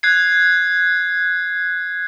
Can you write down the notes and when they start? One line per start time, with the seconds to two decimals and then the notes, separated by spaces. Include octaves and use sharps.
0.03 F#6 G#6 C7